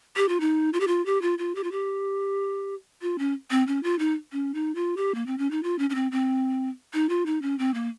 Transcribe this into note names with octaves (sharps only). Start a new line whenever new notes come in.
G4
F4
D#4
F4
G4
F4
G4
F4
F4
G4
F4
G4
F4
C#4
C4
C#4
F4
D#4
C#4
D#4
F4
G4
A#3
C4
C#4
D#4
F4
C#4
C#4
C4
C4
D#4
F4
D#4
C#4
C4
A#3